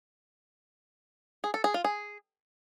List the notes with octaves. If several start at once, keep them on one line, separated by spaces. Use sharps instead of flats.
G#4
A4
G#4
F4
G#4